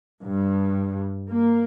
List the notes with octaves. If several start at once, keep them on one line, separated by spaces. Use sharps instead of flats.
G2
A#3